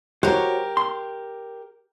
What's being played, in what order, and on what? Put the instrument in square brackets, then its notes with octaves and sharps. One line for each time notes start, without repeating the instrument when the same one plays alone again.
[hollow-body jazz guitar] F#4 C5 C#5 [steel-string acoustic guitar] G4 A#4
[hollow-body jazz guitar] C6